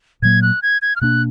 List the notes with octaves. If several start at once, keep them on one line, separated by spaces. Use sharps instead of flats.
A#2 F#3 A#3 G#6
F#6
G#6
G#6
F6
B2 A#3 D4 F#6